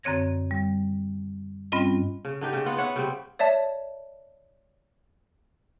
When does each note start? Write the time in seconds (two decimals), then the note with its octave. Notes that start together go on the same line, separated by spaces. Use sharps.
0.03 F#2 D3 C4 C#5 G#6 A#6
0.51 G3
1.72 G2 G3 C4 C#4 F4 D#5
2.25 C#3
2.41 D3 D#4 G4
2.53 C#3 G#4
2.66 B3 F4 F5 F#5
2.78 B3 C#5 E5 F#5
2.96 C#3 G3 C4
3.39 C#5 D5 E5 A5